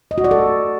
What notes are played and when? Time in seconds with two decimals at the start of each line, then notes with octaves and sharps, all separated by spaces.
0.11 D#5
0.18 F#4
0.24 D5
0.31 A4